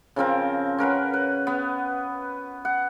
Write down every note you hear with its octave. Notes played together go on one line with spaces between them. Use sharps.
C#3 F3 C4 A#4
C#4 A#4 B4 F#5
B4
B3
F#5